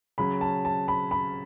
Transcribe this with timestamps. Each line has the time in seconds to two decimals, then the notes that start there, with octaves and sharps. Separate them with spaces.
0.18 C#3 F#3 C#4 B5
0.41 A5
0.65 A5
0.88 B5
1.11 B5